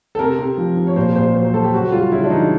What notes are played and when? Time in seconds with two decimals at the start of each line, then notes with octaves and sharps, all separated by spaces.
0.15 A4
0.19 C3 A#4
0.39 C3
0.57 F3
0.77 F3
0.87 C#5
0.96 A#2 C5
1.16 A#2 C5
1.35 F#3 C5
1.45 C5
1.53 F#3 A4
1.64 G4
1.73 C#3 F#4
1.92 G3 F4
2.12 C#3 E4
2.23 D4
2.30 E3 D#4